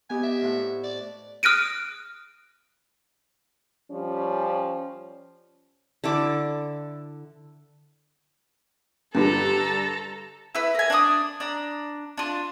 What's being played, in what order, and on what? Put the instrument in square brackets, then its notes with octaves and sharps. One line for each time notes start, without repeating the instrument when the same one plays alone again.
[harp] B3 G4 D#5 [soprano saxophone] G#5
[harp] D5 [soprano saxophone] E5
[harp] A2 C5 F#5
[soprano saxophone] D5
[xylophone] D#6 F6 F#6 A#6 D7 D#7
[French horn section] F3 G3 C#4
[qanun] D3 E4 A4 D6
[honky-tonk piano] G2 D3 G3 [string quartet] A4 A#5
[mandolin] E4 B4
A#4 G#5
D4 D5 C6 D#6
D4 A#5
D4 F4